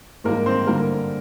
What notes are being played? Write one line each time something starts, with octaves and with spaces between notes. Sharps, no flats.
G#2 D#3 G3 A#3 A#4
C4 C5
G2 D3 G3 A#3 A#4